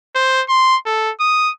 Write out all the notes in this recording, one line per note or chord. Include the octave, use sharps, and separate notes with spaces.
C5
C6
A4
D#6